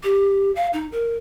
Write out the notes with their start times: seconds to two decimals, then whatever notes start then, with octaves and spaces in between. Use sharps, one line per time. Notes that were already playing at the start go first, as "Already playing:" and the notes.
0.03 G4
0.56 F5
0.73 D#4
0.92 A#4